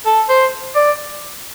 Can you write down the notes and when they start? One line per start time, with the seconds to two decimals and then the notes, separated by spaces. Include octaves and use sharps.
0.06 A4
0.29 C5
0.75 D5